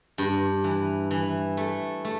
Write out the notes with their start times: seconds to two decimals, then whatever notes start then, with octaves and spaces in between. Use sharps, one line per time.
0.18 G2
0.64 E3
1.11 E3
1.57 A3
2.05 A3